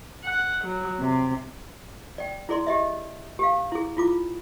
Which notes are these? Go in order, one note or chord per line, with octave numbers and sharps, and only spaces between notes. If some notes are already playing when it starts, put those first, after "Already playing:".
F#5
F#3
C3
D5 G5
E4 G#4 D5 C6
G4 D#5 E5
G4 F5
E4 G#4
E4 F4 D6